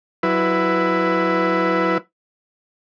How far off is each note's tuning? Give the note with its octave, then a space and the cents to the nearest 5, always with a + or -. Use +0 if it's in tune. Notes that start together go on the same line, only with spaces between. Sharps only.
F#3 +0 E4 +0 B4 +10